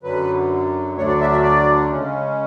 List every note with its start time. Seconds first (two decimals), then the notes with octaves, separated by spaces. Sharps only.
0.03 F#2 D3 F#3 B4
0.96 D2 D3 F#3 A3 D4 C#5
1.08 D5
1.21 E5
1.32 E5
1.43 D5
1.90 C#3 G#3 C#4